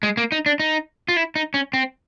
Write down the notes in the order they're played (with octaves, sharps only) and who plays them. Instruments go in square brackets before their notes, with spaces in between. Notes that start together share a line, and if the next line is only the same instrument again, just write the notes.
[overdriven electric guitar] G#3
A#3
D#4
D4
D#4
F4
E4
D#4
C#4
C4